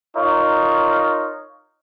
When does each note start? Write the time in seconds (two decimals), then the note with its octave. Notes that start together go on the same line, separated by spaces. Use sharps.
0.17 D#4 F4 A#4 C#5